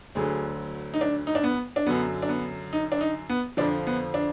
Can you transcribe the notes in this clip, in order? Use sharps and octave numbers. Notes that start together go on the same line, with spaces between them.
D2 D3 F#3 G#4
D#4
D4
D#4
D4
B3
D4
F#2 D3 F#3 B3
D4
B3
D#4
D4
D#4
B3
F2 D3 F3 D4
B3
D4